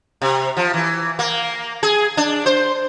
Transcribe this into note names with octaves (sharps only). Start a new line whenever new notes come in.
C3
F3
E3
A#3
G#4
D4
C5